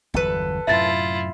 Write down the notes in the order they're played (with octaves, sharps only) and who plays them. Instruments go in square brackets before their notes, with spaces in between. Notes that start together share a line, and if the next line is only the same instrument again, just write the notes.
[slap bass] G1 E2 F#3 [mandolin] A4 B4
[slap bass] F#2 A2 C3 [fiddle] E4 F4 [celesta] E5 A6